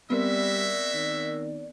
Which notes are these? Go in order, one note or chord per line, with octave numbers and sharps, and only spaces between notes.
G3 G#3 B3 C4 F#4 A#4 D5 E5
D#3